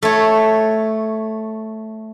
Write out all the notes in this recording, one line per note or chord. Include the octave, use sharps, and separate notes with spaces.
A3 C#5